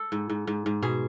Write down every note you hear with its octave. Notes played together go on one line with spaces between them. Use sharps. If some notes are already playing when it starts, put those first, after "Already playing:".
Already playing: A4
G#2
G#2
G#2
G#2
B2 G#4